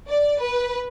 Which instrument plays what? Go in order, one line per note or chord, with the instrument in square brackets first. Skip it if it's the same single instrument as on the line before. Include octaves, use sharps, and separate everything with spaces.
[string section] D5
B4